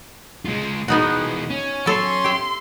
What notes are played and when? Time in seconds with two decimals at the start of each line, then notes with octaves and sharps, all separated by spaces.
0.45 G#3 F4
0.88 E3 G#3 B3 D#4 F#4
1.50 C#4
1.86 F#3 A4 C6
2.24 G4 E5